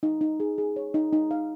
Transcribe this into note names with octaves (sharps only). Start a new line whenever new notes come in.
D#4
D#4
G#4
G#4
C#5
D#4
D#4
F5